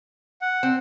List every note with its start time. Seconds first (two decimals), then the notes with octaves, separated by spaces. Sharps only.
0.41 F#5
0.63 C4